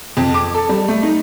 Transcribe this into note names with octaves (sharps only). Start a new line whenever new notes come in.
F2
D6
A4
G3
A3
D#4